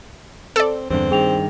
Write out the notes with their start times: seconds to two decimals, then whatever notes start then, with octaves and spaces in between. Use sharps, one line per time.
0.56 C4 A4 D5
0.90 E2 G2 D3 C4
1.11 G2 D#3 G#4 G5 F7